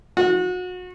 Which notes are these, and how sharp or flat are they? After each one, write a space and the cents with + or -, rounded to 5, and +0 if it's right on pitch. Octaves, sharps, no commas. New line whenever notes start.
F#4 -30